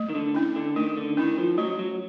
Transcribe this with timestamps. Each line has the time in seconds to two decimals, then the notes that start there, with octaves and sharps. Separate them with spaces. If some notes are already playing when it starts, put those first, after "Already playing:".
Already playing: A3
0.09 D#3
0.15 D3
0.35 C#4 E4
0.56 D3
0.76 D#3 A3
0.97 D3
1.17 D#3 C#4 E4
1.38 F3
1.58 F#3 A3
1.79 F#3